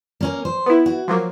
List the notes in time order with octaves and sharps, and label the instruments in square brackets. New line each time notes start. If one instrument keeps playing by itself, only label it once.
[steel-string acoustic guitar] A#3 C#4 A#4
C5
[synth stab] B3 E4
[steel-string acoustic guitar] F#4
[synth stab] F3 F#3 A#3